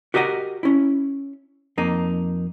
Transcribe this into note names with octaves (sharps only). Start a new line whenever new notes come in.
F#4 G4 A#4 D#5 F5 F#5
C#4 E4
F2 A#3 D#4